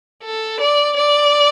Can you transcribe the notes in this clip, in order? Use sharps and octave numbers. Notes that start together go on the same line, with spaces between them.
A4
D5
D5